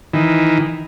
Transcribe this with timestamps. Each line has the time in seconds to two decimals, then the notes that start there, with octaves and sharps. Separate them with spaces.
0.13 D#3 E3